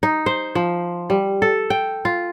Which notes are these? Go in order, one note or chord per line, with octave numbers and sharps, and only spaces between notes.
D#4
C5
F3
G3
A4
G5
F4